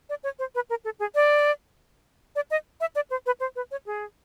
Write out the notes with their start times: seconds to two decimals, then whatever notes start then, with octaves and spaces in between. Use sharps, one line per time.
0.09 D5
0.24 C#5
0.39 C5
0.55 B4
0.70 A#4
0.85 A4
1.00 G#4
1.15 D5
2.36 D5
2.51 D#5
2.81 E5
2.95 D5
3.10 C5
3.26 B4
3.40 C5
3.56 B4
3.71 C#5
3.86 G#4